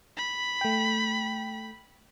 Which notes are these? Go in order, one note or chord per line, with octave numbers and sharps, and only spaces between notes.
B5
A3 G5